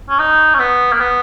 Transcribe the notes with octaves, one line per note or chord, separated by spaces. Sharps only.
C#4
D#4
C#4
B3
A#3
B3